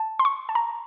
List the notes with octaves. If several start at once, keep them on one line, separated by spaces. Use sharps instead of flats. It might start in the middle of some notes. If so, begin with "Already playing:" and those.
Already playing: A5
C6
C#6
A5
A#5